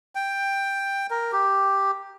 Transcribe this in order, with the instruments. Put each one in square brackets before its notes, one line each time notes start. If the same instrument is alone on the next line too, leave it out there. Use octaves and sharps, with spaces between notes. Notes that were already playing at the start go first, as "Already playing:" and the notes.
[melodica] G5
A#4
G4